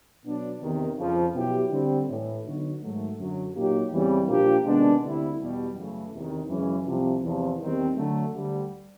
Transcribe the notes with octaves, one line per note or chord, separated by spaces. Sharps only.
B2 F#3 B3 D4
E2 C3 D#3
F2 C#3 F3
B2 F#3 B3 E4 G4
D3 G3 C4
A2 E3 A3
D3 F#3 B3 D#4 F#4
G#2 D#3 F#3 A3
F#2 D3 F#3
A#2 F#3 A#3 D#4 G4
E2 C#3 E3 G3 C4
A#2 F3 A#3 D4 G4
C3 D#3 G#3 B3 D4
D2 D3 G3 C4 E4
E2 B2 G3
F#2 C#3 E3 A3
E2 C3 D#3
F#2 C#3 E3 G#3 C#4
C2 C3 F3
E2 C3 F3
E2 C3 D#3 G3 C4
D3 F#3 A3
D2 D3 G3